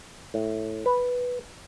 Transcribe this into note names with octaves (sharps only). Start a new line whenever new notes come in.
A2
B4